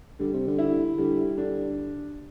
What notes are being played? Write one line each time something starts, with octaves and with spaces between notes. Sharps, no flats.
D3 G3
C3
D3
E4
D3 G3
D3 D4